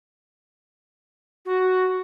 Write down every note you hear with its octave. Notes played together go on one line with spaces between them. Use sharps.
F#4